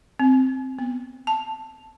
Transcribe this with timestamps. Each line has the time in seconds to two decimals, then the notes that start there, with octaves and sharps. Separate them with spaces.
0.20 C4
0.79 B3
1.27 A5